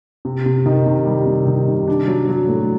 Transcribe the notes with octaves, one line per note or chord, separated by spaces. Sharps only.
C3
C3
D#3
C3
G3
C3
D#3
C3
D4
F#3
F#3
A2